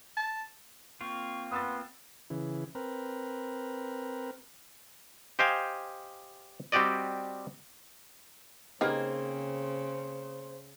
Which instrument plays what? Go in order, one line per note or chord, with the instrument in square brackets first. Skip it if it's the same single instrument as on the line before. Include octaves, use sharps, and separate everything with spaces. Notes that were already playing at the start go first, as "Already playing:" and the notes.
[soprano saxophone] A5
[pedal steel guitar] A#3 C4 F4 [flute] C#6
[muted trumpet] B3 [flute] C6 [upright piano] D#6 E6 A6
[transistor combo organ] C#3 E3
C4 A#4 B4
[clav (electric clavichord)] G4 C5 D#5 F5 G5 G#5
G3 C4 F#4 G4 D5 D#5
[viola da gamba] C#3 [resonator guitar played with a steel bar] A#3 C4 G#4 [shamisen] D#4 G4 B4 [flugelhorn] C5